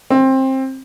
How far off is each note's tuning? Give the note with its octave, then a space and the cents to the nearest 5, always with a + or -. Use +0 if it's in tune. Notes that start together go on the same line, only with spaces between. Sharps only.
C4 +20